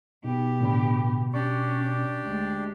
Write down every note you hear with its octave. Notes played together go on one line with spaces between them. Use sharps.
B2 B3 D#4 G4
A2 D3 B5
C#4 D4 G4 D5 C#6
D2 G#3